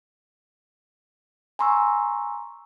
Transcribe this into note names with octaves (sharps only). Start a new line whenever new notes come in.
G#5 A#5 C6 C#6 E6